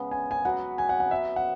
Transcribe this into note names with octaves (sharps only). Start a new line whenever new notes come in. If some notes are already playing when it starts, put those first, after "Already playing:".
Already playing: C#3 G#3 B3
G#5
G#5
F#3 B3 F#4 B4 F#5
G#5
F#5
F#5
E5
F#5